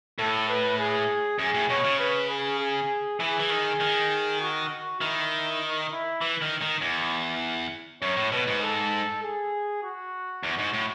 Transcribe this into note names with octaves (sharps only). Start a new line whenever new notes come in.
A2 A4
B4
G#4
F#2 G#4
A2
B2 C#5
C#3
B4
G#4
G#4
E3 G#4
E3
D#3
D#3
F#4
D#3 E4
D#4
E4
E3
D#3
D#3
E2
F#2 C#5
A2
B2 B4
G#2
A4
G#4
F#4
E2
G#2
A2